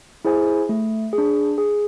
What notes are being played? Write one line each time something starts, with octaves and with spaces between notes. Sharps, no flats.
E4 G#4 C5 G#5
A3
G#4
D4
G#4